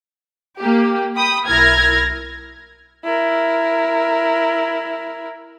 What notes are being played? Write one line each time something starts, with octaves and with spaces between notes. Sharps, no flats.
A#3 G4
G5 B5 D#6
B1 E4 A#4 F6 G#6 A#6
E4 A#4